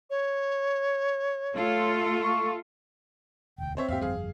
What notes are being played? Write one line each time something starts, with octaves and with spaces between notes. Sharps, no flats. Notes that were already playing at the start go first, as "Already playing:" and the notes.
C#5
A3 F4 A4
C#6
E1 D2 G5
C4 C5 C#5 E5
E2 G#2 A#3 G4 E5 F5
G1 F2 G3 G#4 F5